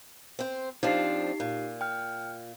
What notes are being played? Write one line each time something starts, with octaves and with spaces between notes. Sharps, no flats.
C4 C5
F3 C4 D4 D#4 G4 C7
A#2
G5 F6